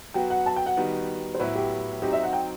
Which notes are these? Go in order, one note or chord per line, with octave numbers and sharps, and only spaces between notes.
F#3 B3 F#4 G5
F#5
A5
G5
F#5
D#3 G3 B3 D#4 F#4
C5
A2 F#3 B3 E4 B4
G4
F#3 C4 D#4 F#4 G4
E5
F#5
G5